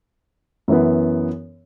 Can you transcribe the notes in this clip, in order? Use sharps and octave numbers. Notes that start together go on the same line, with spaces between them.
F#2 E3 B3